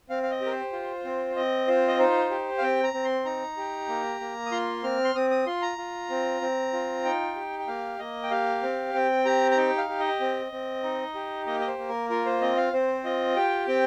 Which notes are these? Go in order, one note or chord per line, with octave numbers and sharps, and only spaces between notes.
C4 F5
F5
D#5
G4
A#4
C5
F4
C4
C4 D#5
F4 C5
D#5
D#4 C5
G4
F5
C4 G5
A#5
C4
C6
D#4 A#5
G4
A#3
A#3
D#6
F4 C6
C4 F6
C6
C4 D#6
D#6
F4 C6
A#5
F4
C4
C4
F4
D#4 G5
G4
G5
A#3 F5
A#3 D#5
G5
G4 F5
C4
C4 G5
G4 A#5
A#5
D#4 G5
F5
G4
D#5
C4
C4
D#4
G4
A#3 D#5
D#5
C5
A#3
A#4
F4 A#4
C5
C4 D#5
F5
C4 C5
F4 D#5
G4 G5
C4 G5